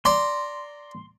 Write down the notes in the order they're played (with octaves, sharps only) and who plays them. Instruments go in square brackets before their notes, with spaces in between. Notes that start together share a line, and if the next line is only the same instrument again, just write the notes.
[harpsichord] D5 A#5 [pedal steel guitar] C6